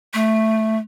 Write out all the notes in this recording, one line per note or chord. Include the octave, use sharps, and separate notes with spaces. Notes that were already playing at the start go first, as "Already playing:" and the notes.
A3